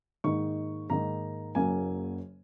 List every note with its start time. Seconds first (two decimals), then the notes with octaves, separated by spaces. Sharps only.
0.24 G#2 D#3 A#3 D#4 C#6
0.89 G#2 D#3 A#3 D#4 A#5
1.55 F#1 F#2 C#3 F#3 A#3 G#5